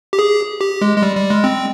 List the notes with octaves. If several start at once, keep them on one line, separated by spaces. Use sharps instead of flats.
G4
G#4
G4
G#3
G#3
G3
G3
G#3
C4